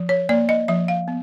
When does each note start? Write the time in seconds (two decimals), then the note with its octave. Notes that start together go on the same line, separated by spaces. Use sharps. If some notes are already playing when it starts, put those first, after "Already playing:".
Already playing: F3
0.09 C#5
0.29 A#3 D5
0.49 D#5
0.68 F3 E5
0.88 F5
1.08 B3